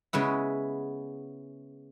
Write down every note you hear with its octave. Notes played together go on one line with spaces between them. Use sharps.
C#3 G#3 B3 E4